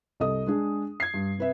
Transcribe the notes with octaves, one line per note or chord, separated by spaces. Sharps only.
C2 A4 D#5 D#6
G#3 D4 G#4
G#6 C7
G2
C3 B4 E5